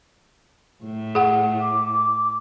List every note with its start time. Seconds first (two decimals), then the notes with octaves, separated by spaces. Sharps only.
0.84 A2
1.15 G#4 F#5
1.61 D6
1.92 D6